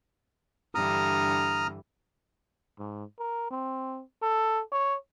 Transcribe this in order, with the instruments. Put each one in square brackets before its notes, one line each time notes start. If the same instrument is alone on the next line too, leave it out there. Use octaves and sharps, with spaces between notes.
[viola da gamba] G2 D3 E3 [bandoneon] A#5 D#6 F6
[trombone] G#2
A#4
C4
A4
C#5